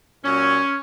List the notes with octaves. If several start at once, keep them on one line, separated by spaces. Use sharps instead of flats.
A#2 F#3 C#4